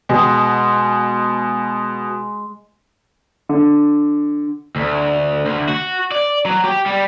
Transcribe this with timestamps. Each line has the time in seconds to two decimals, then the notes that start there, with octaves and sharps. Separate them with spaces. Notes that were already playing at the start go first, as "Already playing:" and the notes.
0.09 B2 G#3
3.49 D3
4.76 D2
5.45 D2
5.69 F#4
6.11 D5
6.46 F#3
6.64 G4
6.86 G3